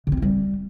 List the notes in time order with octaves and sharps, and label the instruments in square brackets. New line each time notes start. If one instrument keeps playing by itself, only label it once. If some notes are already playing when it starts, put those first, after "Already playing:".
[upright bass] D3
C4
E4
G3